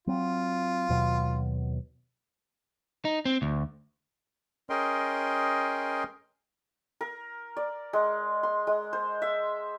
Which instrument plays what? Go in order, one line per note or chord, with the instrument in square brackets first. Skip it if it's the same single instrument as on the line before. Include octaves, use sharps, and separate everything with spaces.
[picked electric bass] F#3 C4 [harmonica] F4
[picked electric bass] D#2 B2 F#3
[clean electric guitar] D#4
C4
D2
[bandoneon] C#4 G#4 A#4 D#5 G5 C6
[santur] A#4
D5
G#3
C6
G#3
C5
E5